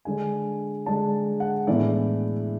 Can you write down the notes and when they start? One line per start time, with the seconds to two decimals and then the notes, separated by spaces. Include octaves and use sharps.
0.05 D3 G#3 D4 G#5
0.86 D3 G#3 D4 A5
1.40 F#5
1.67 A2 E3 G#3 B3 D4 D5